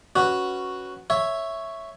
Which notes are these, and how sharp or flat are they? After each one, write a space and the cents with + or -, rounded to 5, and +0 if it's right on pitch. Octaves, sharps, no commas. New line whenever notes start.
C#4 +0 F#4 +0 B4 +0
C#5 +0 E5 +0